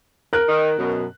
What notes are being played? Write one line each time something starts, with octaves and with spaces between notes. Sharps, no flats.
A#4 F#6
D#3
F#2 B2